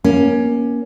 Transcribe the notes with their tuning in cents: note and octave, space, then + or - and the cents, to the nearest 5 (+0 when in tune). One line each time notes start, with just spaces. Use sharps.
A#3 +25 C#4 +5